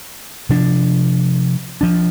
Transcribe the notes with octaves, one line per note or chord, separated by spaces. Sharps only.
C3 F3 D4
F3 D4